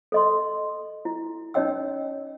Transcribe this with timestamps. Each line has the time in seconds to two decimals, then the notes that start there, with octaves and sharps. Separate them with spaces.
0.12 A4 D#5 C6
1.05 E4
1.54 C#4 D#4 C#5 D#5 G5 E6